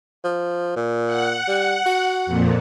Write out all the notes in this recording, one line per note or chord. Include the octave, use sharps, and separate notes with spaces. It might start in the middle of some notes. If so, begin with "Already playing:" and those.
F3
A#2
F#5
G3
F#4
F2 A#2